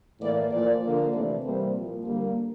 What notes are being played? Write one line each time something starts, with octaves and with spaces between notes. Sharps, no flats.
A2 E3 A#3 D5
A#2 F3 A#3 D5
D3 F3 A#3
C3 E3 A3 D5
C3 E3 G3 A#3 C5
A#2 F3 A#3
D3 G3 A#3